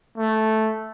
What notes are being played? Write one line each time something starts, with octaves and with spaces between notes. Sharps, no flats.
A3